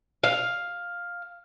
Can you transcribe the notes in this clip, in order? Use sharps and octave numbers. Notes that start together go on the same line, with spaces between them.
F5